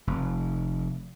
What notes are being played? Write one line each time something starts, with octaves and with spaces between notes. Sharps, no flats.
F1